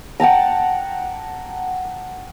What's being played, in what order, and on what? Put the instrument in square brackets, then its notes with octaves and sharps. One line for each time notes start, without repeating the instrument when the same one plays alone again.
[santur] F#5 G5 A5 A#5